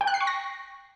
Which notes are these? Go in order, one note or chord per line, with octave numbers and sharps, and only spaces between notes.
G5
F#6
C7
C#6
A#6